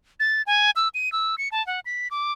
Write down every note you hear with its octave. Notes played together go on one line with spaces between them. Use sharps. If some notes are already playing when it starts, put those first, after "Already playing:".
A6
G#5
E6
D#7
E6
C#7
A5
F#5
B6
D6